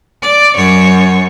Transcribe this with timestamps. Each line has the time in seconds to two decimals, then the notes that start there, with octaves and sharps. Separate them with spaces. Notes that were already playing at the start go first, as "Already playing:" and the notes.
0.22 D5
0.54 F#2 C#5